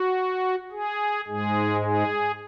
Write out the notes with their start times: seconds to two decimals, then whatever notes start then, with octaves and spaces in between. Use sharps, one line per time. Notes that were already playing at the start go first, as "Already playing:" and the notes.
Already playing: F#4
0.72 G#4
1.27 G#2 G#3 G#4
1.82 G#4